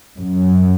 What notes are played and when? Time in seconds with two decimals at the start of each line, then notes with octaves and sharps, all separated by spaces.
0.16 F#2